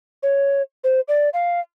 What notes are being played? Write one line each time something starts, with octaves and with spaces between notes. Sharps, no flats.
C#5
C5
D5
F5